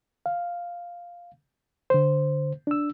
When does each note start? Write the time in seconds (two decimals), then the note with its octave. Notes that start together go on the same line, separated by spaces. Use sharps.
0.26 F5
1.90 D3 C5
2.67 D4 E6